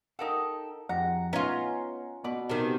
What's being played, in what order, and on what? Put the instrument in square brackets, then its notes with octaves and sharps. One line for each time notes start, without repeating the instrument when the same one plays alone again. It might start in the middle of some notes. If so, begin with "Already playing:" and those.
[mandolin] D#4 G4 A4 [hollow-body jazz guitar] A#4 F5 F#5
[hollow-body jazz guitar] F2 F3 G4 [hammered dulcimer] F#5 [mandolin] A#5
[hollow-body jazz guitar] B3 D#4 [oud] C#4 F4 [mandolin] A#5
[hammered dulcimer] B2 [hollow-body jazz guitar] F#4 [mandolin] B4 D5
[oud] C3 D#3